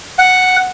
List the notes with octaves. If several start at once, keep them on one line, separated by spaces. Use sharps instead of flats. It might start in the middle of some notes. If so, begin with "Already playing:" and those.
F#5